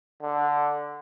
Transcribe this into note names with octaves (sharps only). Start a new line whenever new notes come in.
D3